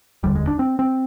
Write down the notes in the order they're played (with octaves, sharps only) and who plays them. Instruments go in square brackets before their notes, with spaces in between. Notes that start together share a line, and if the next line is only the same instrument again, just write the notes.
[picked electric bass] F1 D#2 D3 G3
G#3
D4
C4
C4